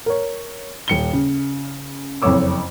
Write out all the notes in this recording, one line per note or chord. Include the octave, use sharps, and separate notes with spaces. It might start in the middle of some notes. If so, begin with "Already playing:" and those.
A#4 C#5
D#1 C#7 G7
C#3
F#1 F2 C4 C#5 D6 E6